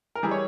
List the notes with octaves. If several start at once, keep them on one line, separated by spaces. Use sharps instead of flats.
A#4
E3 G3 G#4
C#5